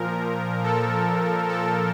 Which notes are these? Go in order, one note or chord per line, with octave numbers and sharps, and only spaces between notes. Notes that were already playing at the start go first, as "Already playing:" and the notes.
Already playing: A#2 F3 A#4
A4
A4